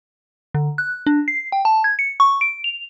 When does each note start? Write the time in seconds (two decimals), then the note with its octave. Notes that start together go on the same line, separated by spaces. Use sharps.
0.55 D3
0.78 F#6
1.07 D4
1.28 C7
1.52 G5
1.65 A5
1.84 G#6
1.99 C#7
2.20 C#6
2.41 D7
2.64 F7